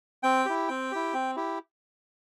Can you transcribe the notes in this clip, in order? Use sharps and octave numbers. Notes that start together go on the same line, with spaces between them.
C4 G5
E4 G4
C4 G5
E4 G4
C4
E4 G4